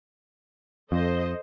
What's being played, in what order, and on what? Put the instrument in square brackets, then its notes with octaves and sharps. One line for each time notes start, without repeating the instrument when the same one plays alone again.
[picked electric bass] F2 [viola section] A4 C5 D#5